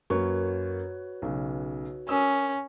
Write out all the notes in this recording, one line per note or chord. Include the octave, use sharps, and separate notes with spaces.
F#2 A#3 F#4 B4 C#5 C#6
B1 C#3
C#4 A#4 D#6 E6